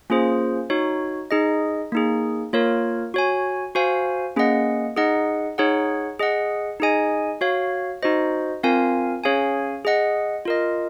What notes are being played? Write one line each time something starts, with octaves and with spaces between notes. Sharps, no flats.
A#3 C#4 F4 G#4 C5
D#4 F#4 C#5
D#4 G#4 D#5
A#3 D#4 G#4
A#3 F4 A#4 C#5
F#4 C#5 G#5
F#4 C5 F5 G#5
A#3 C#4 G#4 D#5 F#5
D#4 G#4 D#5 F#5
D#4 G#4 C#5 F#5
G#4 D#5 F#5
D#4 G#4 D#5 G#5
F#4 C#5 F5
D#4 F#4 C5 D#5
C4 F4 A#4 F5 G#5
C#4 G#4 C#5 F5 G#5
G#4 D#5 F#5
F4 A#4 D#5